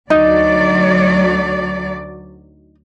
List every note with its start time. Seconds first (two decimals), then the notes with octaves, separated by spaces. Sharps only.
0.10 D2 F#3 D#4 D5